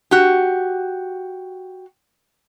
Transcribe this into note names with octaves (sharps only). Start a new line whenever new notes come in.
F#4 G4